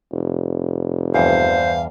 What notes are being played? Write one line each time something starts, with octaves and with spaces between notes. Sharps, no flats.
F1
E2 G2 C5 F5